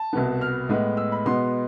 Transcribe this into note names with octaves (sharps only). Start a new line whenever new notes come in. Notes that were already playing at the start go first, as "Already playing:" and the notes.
Already playing: A5
C2 B2 B3
F6
A2 G#3 B3
E6
B5
B2 G#3 B3 C6